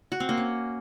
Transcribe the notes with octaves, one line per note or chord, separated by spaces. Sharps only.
F#4
C4
A#3
C#4